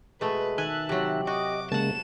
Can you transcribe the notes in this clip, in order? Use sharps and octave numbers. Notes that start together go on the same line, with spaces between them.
B2 G#3 A3 B4
D#3 E5 G#5 A5 F#6
C3 F#3 G4
F#4 D#5 D6
C#3 G#3 A#3 F#5 A5 E7